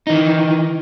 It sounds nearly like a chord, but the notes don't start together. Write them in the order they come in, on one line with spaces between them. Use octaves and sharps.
D#4 E3 D#3